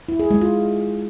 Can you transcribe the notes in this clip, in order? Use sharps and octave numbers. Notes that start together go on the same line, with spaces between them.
E4
G#4
G#3
F4